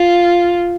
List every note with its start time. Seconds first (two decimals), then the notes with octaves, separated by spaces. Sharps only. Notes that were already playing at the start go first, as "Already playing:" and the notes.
Already playing: F4